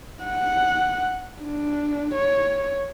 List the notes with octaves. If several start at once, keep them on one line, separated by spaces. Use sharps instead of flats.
F#5
D4
C#5